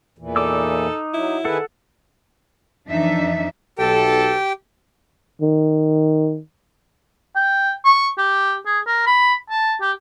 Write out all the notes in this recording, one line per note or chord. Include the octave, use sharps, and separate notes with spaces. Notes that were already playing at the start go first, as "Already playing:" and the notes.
E2 A#2 E3
D#4 A4 D6 E6
F#3 E4
D#3 G#4 A4 B4 F#5
F2 E3 D4 D#4 E5
B1 G4 A4 G5
D#3
G5
C#6
G4
G#4
A#4
B5
A5
G4